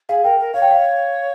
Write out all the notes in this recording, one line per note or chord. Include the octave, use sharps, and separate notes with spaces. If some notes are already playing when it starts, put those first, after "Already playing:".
G#4 F5
A#4 G5
A#4
C#5 F5
G5
F5